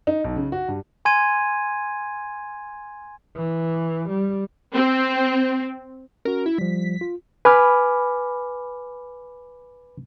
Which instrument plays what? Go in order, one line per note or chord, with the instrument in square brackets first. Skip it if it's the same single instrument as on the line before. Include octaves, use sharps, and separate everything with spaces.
[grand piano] D#4
B1
C#3
F#4
G2
[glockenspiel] G#5 C6 G#6 D#7
[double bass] E3
G3
[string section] C4
[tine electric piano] C#4 F#4 [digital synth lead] A#4
[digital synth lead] E4
[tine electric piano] F3 G3 [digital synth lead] B6
[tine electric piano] F4
[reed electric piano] B4 G#5 B5 D6 F6